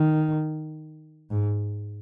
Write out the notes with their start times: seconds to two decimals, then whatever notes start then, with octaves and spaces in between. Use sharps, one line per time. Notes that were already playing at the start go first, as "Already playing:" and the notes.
Already playing: D#3
1.30 G#2